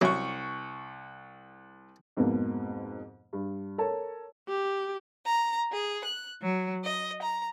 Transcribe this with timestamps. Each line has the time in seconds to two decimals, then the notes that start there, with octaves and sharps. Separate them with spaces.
0.01 C2 F#3 C#4 E4 C#6
2.17 F2 G#2 B2 A#3 B3
3.33 G2
3.78 A4 A#4 C#5 A5
4.48 G4
5.26 A#5
5.72 G#4
6.04 F#6
6.42 F#3
6.83 D#5
7.22 A#5